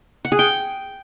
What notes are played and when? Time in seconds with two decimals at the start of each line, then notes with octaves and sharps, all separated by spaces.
0.25 F#5
0.32 G#4
0.39 G5